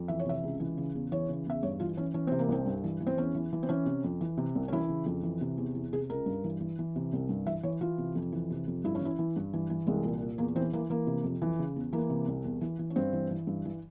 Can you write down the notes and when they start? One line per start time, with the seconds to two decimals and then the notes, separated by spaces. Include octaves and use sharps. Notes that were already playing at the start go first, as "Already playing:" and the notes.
Already playing: F2
0.08 E3 E5
0.19 C#5
0.25 C3 E5
0.43 C#2
0.60 E3
0.77 C#3
0.95 E2
1.12 E3 C#5
1.29 C#3
1.47 E2 E5
1.63 G2 C#5
1.80 E3 F4
1.97 E3 C#4
2.14 E3 C#4
2.27 C3 C4
2.39 A#3
2.48 C2 C4
2.66 G2
2.84 E3
3.00 E3
3.07 C4
3.17 E2 C#4
3.35 E3
3.53 E3
3.63 C4
3.69 E3 C#4
3.86 C3
4.04 F2
4.21 E3
4.37 C3
4.55 C2
4.68 C#4
4.72 E3 E4
4.89 C#3
5.06 F2
5.23 E3
5.41 C3
5.58 E2
5.75 E3
5.93 C3 G#4
6.10 C#2 A#4
6.26 G2
6.44 E3
6.60 E3
6.79 E3
6.96 C3
7.13 C2
7.29 G2
7.46 E3 E5
7.63 E3 C#5
7.81 E3 F4
7.98 C3
8.15 F2
8.32 E3
8.50 C3
8.68 F2
8.84 G2 E4
8.95 C#4
9.01 E3 E4
9.19 E3
9.36 G2
9.53 E3
9.70 E3
9.87 C2 G#3
10.04 A#2
10.22 A#2
10.38 E2 A#3
10.56 E3 C4
10.73 E3 A#3
10.90 E3 A#3
11.07 C3
11.24 F2
11.42 E3
11.59 C#3
11.76 E2
11.93 E3 A#3
12.10 C3
12.28 C2
12.44 E2
12.61 E3
12.79 E3
12.90 C#4
12.96 G2 C4
13.13 E3
13.30 E3
13.47 G2
13.65 E3